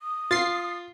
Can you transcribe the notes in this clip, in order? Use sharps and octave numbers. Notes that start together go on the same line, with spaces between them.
D#6
F4 A6 C7